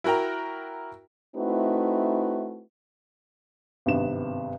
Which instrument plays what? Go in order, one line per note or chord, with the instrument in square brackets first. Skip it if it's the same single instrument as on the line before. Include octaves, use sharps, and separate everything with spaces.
[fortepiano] E4 F#4 A#4 G5 A#5
[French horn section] A3 C4 D#4 E4 F#4 B4
[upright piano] G#1 G2 C3 B3 E7